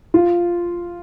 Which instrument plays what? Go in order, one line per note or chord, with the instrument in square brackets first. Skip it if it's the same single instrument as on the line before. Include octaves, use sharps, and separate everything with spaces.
[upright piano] F4